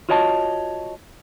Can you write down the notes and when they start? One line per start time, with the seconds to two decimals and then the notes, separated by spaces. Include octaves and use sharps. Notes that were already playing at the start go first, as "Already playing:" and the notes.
0.09 F4 F#4 C#5 D#5 G5 A5